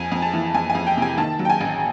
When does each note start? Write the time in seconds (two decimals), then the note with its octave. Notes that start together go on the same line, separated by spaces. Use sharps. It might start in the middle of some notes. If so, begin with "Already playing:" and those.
Already playing: F2 G#5
0.12 F2
0.22 A5
0.34 E3
0.54 F2 G#5
0.70 G#5
0.75 F2
0.87 G5
0.97 C3
1.02 G#5
1.18 D#3 A5
1.39 F#3
1.45 G5
1.50 G#5
1.61 A1